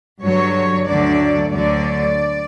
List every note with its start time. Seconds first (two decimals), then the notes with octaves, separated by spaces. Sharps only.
0.22 G2 D3 F#3 C#5
0.87 D2 D3 F#3 D5
1.52 D2 D3 F#3 D5